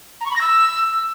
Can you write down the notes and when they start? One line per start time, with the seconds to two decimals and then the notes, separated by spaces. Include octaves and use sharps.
0.20 A#5
0.25 C#6
0.30 B5
0.35 A#6
0.41 E6